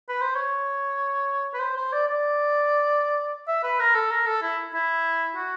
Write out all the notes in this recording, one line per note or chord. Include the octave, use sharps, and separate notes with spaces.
B4
C5
C#5
B4
C5
C5
D5
D5
E5
B4
A#4
A4
A#4
A4
E4
E4
F#4